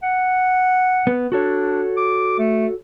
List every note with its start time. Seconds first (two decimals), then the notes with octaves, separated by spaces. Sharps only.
0.03 F#5
1.07 B3
1.32 D4 F#4 A4 C#5
1.97 D6
2.39 A3